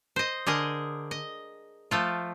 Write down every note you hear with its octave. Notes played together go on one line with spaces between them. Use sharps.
C5 D#5
D3 G#4 A#4 D#5
D#5
F3 A3 F4